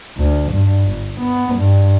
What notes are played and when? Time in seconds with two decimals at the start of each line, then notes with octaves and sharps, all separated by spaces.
0.17 D2
0.52 G2
0.85 G1
1.20 B3
1.56 G2